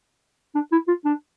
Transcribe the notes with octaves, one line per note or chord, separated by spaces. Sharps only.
D4
E4
F4
D4